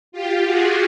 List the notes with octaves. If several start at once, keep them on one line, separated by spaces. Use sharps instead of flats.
F4 G4
F#4 G#4